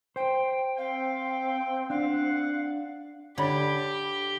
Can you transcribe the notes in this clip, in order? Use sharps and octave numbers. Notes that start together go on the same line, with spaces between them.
C5 G5
C4 F5 G5
D4 F5 F#5
D3 G4 C#5 B5